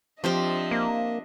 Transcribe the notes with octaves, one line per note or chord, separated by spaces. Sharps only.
F3 C4 D4 G4 C5 D#5 E5
A#3